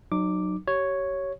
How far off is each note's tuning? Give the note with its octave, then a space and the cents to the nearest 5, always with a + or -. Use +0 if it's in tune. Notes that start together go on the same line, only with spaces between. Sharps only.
F#3 +0 D#4 -30 D6 +0
G4 -35 C#5 +0